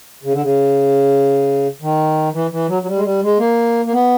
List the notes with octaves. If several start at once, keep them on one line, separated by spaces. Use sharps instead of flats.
C#3
D3
C#3
D#3
E3
E3
F#3
F#3
G3
G#3
G3
G#3
A#3
A#3
B3